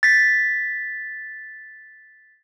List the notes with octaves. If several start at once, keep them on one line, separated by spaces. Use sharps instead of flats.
A6 B6